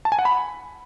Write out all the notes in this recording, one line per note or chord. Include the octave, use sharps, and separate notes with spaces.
A5
G#5
F#5
B5